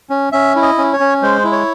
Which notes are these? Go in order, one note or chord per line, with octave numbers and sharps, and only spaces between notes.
C#4
C#4 E5
E4
D#5
C#4
C#5
C#4
G#3 C5
E4
C#5